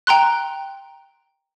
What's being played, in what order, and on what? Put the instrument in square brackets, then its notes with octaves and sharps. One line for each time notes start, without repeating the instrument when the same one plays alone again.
[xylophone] G5 A#5 C6 F#6